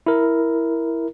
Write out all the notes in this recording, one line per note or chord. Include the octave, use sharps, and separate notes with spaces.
E4 A#4